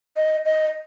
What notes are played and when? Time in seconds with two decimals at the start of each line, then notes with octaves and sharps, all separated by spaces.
0.17 D#5
0.45 D#5